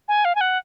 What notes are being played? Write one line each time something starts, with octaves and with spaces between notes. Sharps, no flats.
G#5
F5
G#5
F#5